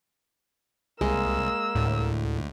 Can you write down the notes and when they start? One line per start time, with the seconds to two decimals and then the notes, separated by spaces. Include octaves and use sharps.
1.01 C2 G#3 A#3 E6
1.75 D2 A2